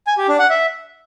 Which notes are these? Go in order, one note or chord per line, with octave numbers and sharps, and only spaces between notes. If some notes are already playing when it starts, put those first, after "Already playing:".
G#5
G4
D4
F#5
E5